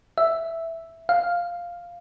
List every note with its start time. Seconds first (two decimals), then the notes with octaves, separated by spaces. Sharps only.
0.18 E5
1.09 F5